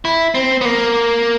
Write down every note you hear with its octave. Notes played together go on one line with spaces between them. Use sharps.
E4
C4
B3
A#3